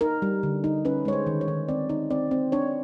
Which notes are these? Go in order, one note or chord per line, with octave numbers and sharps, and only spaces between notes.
D#4 A#4
G3
D3
D#4
C#4 B4
G#3 C#5
C5
D#3
C#5
D#3
C4 D5
D#4
C4 D5
C4
D4 C#5